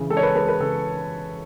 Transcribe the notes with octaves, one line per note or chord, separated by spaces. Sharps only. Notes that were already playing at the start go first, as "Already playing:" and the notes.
Already playing: C#3 E3
G#3 A4
C#5
B4
G#3 B4
B4
C#3 A4